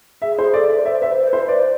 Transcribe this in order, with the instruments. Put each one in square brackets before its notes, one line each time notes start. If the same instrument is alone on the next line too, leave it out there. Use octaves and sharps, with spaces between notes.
[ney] G#4 [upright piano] E5
[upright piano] C5
[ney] A4 [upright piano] D5
[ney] D5
[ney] C5 [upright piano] E5
[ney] B4 [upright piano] E5
[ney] C5
B4
[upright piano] C5
[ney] C5 [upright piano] D5